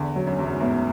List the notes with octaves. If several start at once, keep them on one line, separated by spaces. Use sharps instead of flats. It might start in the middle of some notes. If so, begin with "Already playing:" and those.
Already playing: E2 D3
F#3
F#2
E2 F#3
F#2
G#2
A2 B3